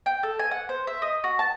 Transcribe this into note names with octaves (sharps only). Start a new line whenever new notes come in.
G5
A4
G#5
F#5
C5
E5
D#5
F#4
A5